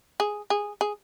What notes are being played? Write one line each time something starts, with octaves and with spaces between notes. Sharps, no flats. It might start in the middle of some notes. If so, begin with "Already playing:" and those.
G#4
G#4
G#4